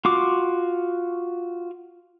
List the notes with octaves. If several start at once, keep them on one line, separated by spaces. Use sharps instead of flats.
F4 F#4 D6